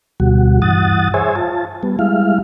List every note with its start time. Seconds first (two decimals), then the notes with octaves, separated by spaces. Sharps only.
0.20 D2 B2 G3 F#4
0.62 G2 E3 F#5 D#6 A6
1.14 G#4 C5 C#5 E5 G#5
1.36 F4 A5
1.83 G3 B3
1.99 G3 G#3 E4 F5